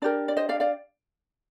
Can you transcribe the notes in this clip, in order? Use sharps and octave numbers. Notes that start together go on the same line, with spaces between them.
D4 G4 A#4 D5
D5
C5 D#5
D5 F5
D5 F5